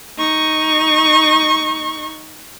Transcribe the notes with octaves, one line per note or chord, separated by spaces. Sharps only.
D#4 C#6